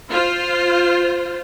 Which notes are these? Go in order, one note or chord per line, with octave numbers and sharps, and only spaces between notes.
F4 C5